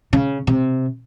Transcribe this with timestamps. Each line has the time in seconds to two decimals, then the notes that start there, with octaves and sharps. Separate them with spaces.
0.13 C#3
0.47 C3